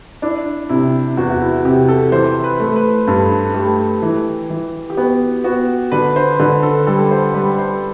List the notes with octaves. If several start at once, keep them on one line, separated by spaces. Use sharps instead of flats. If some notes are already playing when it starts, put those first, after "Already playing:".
D4 E4
C3 E4
E2 F#4
F#4
E4
C3 G4
A4
E3 C5
B4
A3
B4
G2 A4
A3 G4
E3
E3
G4
B3 F#4
B3 F#4
D3 B4
C5
D3 B4
A4
G3 A4
C5
G3 B4
C5